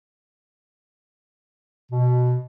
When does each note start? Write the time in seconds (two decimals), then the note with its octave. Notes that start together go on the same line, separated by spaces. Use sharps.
1.92 B2